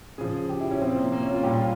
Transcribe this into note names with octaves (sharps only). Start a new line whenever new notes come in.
C#3 F3 G#4
G4
E4
C#4
C3 F3 C4
A#3
A#3
C#4
F4
A#2 G3 G4
F4